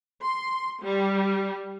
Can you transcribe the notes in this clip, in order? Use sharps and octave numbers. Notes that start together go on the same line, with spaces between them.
C6
G3